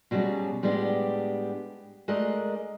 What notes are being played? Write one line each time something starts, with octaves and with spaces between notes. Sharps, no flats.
B2 F#3 G3 B3 C#4 G#4
A2 G3 G#3 B3 D4 G4
G#3 A3 D4 A#4 D#5